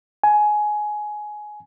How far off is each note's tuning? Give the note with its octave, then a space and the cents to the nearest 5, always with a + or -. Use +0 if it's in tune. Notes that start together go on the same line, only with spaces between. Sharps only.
G#5 +15